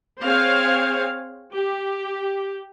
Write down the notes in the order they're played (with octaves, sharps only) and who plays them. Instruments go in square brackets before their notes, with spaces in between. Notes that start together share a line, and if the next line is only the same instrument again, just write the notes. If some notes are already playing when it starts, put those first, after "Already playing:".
[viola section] C4 G#4 C5 C#5 F5
G4